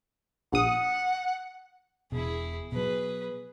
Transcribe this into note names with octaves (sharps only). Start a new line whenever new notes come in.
A#1 F#5 D#6
E1 B2 E4 G#4
B2 F#3 G#4 B4